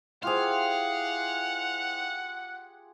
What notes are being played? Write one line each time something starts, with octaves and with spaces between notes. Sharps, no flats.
E4 F4 G4 G#4 C5 F5 F#5